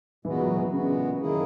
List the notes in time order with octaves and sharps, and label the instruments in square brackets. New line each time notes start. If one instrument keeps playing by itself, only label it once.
[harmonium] A#2 G#3 B3 F#4 [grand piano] E3
[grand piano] F#3
E3
[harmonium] A#2 G#3 B3 F#4 [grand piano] C#3
[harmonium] F#2 D#3 A#3 E4 G#4